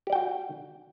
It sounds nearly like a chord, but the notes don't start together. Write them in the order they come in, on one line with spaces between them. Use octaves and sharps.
G4 D5 G5 F#4